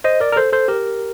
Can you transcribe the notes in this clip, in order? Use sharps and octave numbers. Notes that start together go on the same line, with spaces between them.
C5 D#5
A#4 D5
A#4
A4 C5
A4 C5
G4 A#4